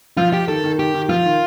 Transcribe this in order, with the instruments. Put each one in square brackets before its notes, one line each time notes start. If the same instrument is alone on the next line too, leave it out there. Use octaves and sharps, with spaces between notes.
[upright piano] F3 [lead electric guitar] F4
[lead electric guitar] G4
[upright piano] D#3 [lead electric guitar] A4
[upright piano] D#3
[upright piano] D#3 [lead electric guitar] G4
[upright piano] D#3
[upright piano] F3 [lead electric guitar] F4
[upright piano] D#3